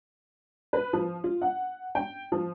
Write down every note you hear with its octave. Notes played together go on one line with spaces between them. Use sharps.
B4
F3
F4
F#5
G5
F3